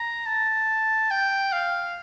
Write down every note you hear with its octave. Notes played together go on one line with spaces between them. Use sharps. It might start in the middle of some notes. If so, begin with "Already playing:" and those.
Already playing: A#5
A5
G5
F5